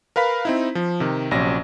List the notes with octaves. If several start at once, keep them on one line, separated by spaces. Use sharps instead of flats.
A#4 B4 F5 B5 B6
C4 D#4 E4
F3
C3 D#3
A#1 C3 F#3 C#4 A#6